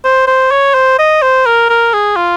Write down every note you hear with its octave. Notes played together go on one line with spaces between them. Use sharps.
C5
C5
C#5
C5
D#5
C5
A#4
A#4
G#4
F4